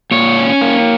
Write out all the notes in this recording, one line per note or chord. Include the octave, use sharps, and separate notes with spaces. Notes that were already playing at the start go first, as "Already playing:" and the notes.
A#2 C#5
C#4
A#3